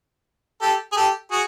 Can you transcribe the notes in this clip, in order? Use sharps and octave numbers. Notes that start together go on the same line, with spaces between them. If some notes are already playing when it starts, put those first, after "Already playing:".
G4 A4
G#4
G4 A4
F#4 G#4